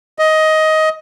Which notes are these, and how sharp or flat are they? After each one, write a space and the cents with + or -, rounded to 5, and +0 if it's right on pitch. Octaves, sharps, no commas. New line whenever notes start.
D#5 +15